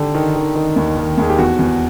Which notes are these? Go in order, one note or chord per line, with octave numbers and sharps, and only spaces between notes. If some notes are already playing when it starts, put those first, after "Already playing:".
Already playing: D3 G4
D#3
D#3
D#3
D#2
D#3
D#2 G#4
G4
E2 F#4
E2